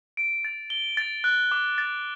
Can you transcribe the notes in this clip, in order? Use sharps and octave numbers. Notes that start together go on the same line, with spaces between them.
D7
A6
G7
A6
F#6
D6
A6